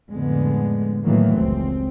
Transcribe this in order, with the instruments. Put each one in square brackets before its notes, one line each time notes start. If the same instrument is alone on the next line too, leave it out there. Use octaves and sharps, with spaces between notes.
[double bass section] F2 A2 D3 G#3 B3
A2 D#3 E3 F#3 A3 A#3
F1 C#2 C4